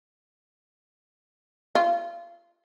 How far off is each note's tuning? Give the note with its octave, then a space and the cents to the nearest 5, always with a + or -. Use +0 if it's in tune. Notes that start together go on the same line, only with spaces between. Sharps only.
F4 -30